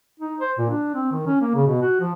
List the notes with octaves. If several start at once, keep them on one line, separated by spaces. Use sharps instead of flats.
D#4
C5
A#2
D4
C4
D#3
C#4
A#3
C#3
B2
F#4
F3